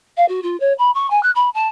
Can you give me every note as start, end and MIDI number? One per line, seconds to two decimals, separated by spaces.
0.17 0.25 77
0.29 0.40 66
0.43 0.57 65
0.60 0.73 73
0.78 0.91 83
0.95 1.10 85
1.10 1.22 80
1.23 1.31 90
1.35 1.49 83
1.54 1.68 81